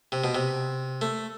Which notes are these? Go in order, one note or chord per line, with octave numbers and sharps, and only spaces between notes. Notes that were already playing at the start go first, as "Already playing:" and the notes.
C3
B2
C3
A3